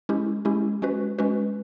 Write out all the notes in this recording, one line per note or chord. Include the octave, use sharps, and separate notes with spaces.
G#3 C#4 E4 G4
G#3 C#4 E4 G4
G#3 C#4 F#4 B4
G#3 C#4 F#4 B4